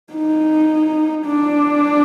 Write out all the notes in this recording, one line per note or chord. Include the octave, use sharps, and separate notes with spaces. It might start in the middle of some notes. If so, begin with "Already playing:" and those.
D#4
D4